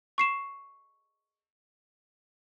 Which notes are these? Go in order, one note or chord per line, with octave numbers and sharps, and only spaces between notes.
C#6 C7 E7